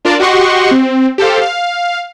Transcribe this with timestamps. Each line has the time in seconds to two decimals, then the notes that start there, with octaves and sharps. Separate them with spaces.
0.05 D4 F4 A#4 D5 A5
0.20 F#4 G4 D#5 F#5 C6 C#6
0.71 C4
1.18 G4 A4 C5 F5
1.42 F5